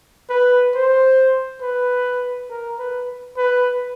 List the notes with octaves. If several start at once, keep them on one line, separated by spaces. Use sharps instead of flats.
B4
C5
B4
A#4
B4
B4